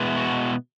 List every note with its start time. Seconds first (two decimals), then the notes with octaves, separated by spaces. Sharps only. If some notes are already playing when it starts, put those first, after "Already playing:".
Already playing: B2 G#3 B3 E4
0.17 F#4